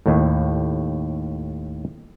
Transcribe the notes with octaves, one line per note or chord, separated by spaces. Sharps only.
D#2 A2